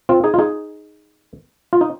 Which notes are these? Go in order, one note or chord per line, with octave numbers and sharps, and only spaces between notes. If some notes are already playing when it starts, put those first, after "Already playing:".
C4 F4
D#4 G#4
F4
D#4 G#4
F4
D#4